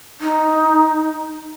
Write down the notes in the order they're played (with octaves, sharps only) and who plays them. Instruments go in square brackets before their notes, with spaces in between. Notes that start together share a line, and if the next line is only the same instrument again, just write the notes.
[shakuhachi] D#4